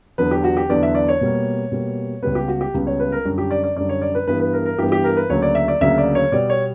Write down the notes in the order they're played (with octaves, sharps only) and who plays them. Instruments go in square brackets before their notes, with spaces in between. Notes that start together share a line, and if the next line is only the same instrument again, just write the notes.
[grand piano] E2 D3 F#3 B3 B4
G4
F#4
G4
E2 D3 F#3 B3 D5
E5
D5
C#5
B2 G3 A#3
B2 G3 A#3
C#2 C#3 G3 B3 B4
G4
F#4
G4
C#2 C#3 G3 B3
C#5
B4
A#4
F#2 D3 G3
G4
D5
D5
F#2 D3 G3 D5
C#5
D5
B4
G2 E3 G3 B3 B4
B4
A#4
A#4
G2 E3 G3 B3 G4
G4
A#4
B4
D2 C#3 F#3 A#3 C#5
D5
E5
D5
D2 C#3 F#3 A#3 E5
D5
C#5
B2 G3 B3 D5
C#5